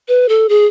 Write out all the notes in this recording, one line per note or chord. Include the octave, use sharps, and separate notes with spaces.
B4
A4
G#4